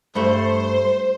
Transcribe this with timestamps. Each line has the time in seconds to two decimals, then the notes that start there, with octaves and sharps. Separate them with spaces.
0.15 G2 A3 C5